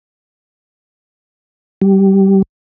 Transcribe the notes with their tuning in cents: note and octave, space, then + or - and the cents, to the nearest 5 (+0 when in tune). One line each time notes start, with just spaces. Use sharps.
G3 -15